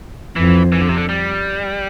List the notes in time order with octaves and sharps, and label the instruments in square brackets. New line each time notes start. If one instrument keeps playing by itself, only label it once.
[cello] F2 [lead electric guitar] E3
[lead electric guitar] E3
D3
C3
D3
G3